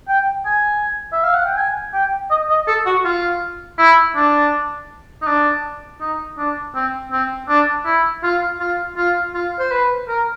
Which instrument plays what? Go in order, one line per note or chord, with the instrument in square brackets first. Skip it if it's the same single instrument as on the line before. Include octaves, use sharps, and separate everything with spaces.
[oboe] G5
G#5
E5
F5
F#5
G5
G#5
G5
D#5
D#5
A4
F#4
F4
E4
D4
D#4
D4
D#4
D4
C4
C4
D4
E4
F4
F4
F4
F4
C5
B4
A#4